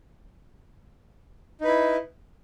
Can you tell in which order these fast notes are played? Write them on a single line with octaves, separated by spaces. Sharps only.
D#4 B4 E4